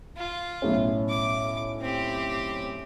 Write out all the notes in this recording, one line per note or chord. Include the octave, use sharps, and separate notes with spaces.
F4
B1 A2 C#4
D6
C4 G4